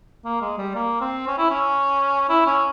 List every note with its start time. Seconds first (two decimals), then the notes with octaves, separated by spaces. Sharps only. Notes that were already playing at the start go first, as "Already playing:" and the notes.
0.25 A#3
0.41 G#3
0.58 G3
0.75 A#3
1.01 C4
1.27 C#4
1.38 E4
1.50 C#4
2.29 E4
2.46 C#4